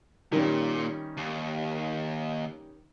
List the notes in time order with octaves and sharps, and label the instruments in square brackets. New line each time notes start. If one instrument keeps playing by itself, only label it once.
[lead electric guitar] A#2 [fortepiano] D#3 G3 C#4
[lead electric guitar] D#2